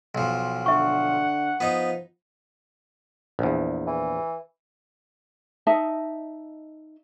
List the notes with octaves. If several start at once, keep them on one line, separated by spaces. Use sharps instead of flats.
B1 F3
D3 E5 F#5 C#6
F3 B3 D#4
A#1 E2
E3
D#4 D#5 E5 A5